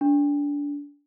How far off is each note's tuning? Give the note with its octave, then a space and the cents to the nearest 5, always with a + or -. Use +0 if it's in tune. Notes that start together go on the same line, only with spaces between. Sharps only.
D4 -25